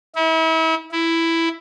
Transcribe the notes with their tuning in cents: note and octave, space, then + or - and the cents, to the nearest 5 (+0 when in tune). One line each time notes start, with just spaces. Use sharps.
E4 -35
E4 +5